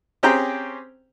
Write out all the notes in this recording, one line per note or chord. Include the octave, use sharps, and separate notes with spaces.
C4 C#4 G4 G#4 G5 A#5